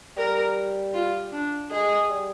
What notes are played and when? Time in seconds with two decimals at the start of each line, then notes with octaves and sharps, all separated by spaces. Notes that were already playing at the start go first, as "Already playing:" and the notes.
0.17 G3 A#4
0.94 F4
1.32 D4
1.70 G#3 G#4
2.09 G3